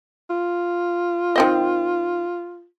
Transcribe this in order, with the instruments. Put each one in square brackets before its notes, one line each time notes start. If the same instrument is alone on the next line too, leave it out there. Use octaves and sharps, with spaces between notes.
[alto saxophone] F4
[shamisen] D#3 C4 D#5